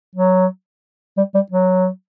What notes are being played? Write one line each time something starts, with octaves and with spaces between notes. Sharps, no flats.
F#3
G3
G3
F#3